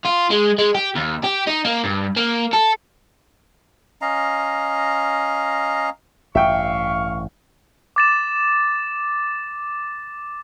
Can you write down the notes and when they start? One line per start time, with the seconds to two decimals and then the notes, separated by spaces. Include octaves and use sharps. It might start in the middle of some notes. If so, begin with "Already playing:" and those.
0.05 F4
0.30 G#3
0.58 G#3
0.74 G4
0.95 D#2
1.24 G4
1.47 D#4
1.65 A#3
1.84 G2
2.16 A#3
2.53 A4
4.02 C#4 D#5 F5 A#5
6.35 A1 G2 E5 F5 G5 C#6
7.96 D6 A6 E7